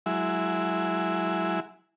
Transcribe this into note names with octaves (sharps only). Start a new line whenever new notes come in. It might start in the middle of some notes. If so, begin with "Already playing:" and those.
F#3 G#3 E4